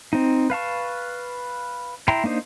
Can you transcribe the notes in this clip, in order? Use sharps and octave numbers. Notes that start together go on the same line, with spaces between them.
C4 D#4
B4 F5 A5 C#6
E4 G5 A#5 C6
A#3 D4 D#4 C5